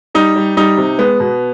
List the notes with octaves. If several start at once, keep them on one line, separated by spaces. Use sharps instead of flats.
G3 D#4
G3
G3 D#4
C3
G#3 B3
B2